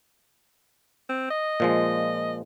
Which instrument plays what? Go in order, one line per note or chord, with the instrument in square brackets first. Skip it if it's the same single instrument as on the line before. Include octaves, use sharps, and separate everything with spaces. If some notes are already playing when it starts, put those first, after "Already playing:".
[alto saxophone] C4
D#5
[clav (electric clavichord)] A#2 F3 G#3